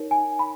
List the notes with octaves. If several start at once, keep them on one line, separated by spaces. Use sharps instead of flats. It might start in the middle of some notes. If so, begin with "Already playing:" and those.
Already playing: D#4 A#4 C#5
G#5
B5